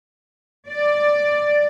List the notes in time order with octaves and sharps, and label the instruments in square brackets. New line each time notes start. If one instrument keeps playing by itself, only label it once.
[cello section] D5